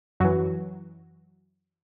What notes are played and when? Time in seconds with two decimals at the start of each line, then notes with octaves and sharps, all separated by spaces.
0.20 F#2 E3 F#3 F#4